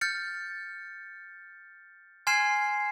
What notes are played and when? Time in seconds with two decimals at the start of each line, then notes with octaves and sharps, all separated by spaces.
0.01 F6 G6 A6 C#7
2.27 G#5 C6 F6 G#6 C7 E7